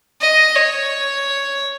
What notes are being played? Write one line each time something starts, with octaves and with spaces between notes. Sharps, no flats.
D#5
C#5